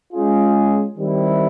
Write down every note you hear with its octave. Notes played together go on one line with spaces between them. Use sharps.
G#3 C#4 F4 G#4
D#3 G3 C4 E4